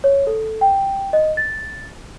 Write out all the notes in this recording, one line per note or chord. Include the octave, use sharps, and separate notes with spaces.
C#5
A4
G5
D#5
A6